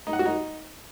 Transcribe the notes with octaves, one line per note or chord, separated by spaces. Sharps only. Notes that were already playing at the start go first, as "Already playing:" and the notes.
D#4
F#5
F#4
D#4